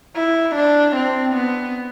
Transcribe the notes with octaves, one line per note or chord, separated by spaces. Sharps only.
E4
D4
C4
B3